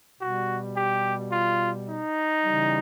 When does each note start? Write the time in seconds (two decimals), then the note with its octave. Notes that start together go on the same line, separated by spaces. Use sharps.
0.20 B2 G3 F#4
0.75 G4
1.31 F4
1.87 D#4
2.43 C#3 E3 G3